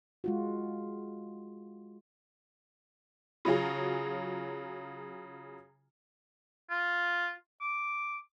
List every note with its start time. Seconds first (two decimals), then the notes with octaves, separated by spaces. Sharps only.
0.24 G#3 F4 F#4
3.45 C#3 F#3 F4 G#4
6.70 F4
7.61 D6